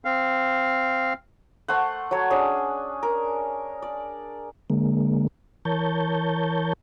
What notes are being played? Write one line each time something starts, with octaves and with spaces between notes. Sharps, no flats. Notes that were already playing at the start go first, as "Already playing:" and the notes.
C4 F5
A3 C5 F#5
F#3 A4 C#5
C#4 D4 G#4
A#4
D5
D3 G#3 A#3
E3 A#4 C#5 A5 G6